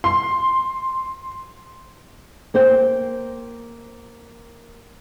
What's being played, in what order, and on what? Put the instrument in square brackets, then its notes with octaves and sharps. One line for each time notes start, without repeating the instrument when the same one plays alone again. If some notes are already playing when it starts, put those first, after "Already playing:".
[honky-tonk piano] C6
[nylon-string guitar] A#3 C5 G5